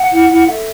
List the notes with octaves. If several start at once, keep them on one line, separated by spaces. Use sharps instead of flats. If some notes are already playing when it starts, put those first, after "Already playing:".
Already playing: F#5
E4
E4
A4 E5